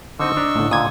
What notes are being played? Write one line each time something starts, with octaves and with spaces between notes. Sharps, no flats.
D3 C4 D#4 D#5 C#6 E6
D4 A#5
A2 D3
A#2 D3 D#6 G#6